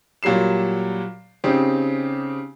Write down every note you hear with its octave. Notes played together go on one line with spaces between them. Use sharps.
A#2 F#3 G3 C7 E7
C#3 C4 D#4 G4